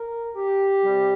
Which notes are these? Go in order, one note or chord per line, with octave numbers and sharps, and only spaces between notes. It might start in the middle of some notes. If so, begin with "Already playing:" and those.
Already playing: A#4
G4
C3 G3